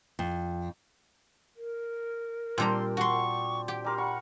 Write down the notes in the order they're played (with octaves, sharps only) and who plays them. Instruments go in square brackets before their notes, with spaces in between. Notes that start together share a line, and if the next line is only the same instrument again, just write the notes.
[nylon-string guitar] F2
[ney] A#4
[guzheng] A#2 G3 A#5 [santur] C4 D4 [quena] C6
[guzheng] F#4 C6 [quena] C#6
[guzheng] G4 [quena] G5
[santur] G3 A#4 C6 [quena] D6
[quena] F#5 [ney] B5 [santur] C#6